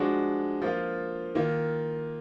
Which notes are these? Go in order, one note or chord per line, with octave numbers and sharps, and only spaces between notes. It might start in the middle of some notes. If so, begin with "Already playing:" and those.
Already playing: F3 G#3 D4 F#4
F3 A#3 F4
D#3 A#3 F4